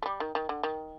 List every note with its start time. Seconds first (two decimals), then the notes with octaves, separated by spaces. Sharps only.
0.02 A3
0.06 G3
0.20 D#3
0.35 D#3
0.49 D3
0.63 D#3